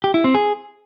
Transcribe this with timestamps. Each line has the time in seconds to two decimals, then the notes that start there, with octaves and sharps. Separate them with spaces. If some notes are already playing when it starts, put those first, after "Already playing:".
0.04 G4
0.14 E4
0.24 C4
0.35 G#4